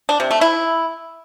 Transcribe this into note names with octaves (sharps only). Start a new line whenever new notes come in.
D4
C3
A3
E4